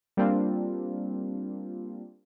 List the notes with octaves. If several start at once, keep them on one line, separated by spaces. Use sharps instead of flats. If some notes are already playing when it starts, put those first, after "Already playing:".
G3 A#3 C4 D4 F4